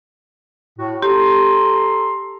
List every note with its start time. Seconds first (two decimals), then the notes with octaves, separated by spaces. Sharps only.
0.79 A2 F#4
1.03 G4 A4 A#5 C6